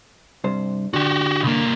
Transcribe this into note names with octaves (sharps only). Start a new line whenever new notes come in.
G2 C3 C5
D3 F#4 G4
C2 A#3